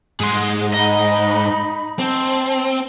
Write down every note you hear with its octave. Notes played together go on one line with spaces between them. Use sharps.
G#2 G#4 C6
D#4 D#5 B5
C4 A5 C6